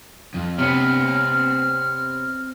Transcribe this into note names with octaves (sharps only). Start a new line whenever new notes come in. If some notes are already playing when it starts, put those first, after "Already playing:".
F2
C3 B3 C4 C#5 F6